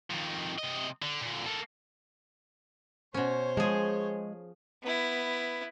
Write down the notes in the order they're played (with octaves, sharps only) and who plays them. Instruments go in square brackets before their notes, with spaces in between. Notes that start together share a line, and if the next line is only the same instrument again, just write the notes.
[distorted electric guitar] F2 D#3
C3 D#5
D3
A#2 D3
A#3 A4
[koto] B2 C#4 [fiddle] C5 C#5
[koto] F3 G#4 [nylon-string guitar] G#3
[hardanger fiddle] B3 E4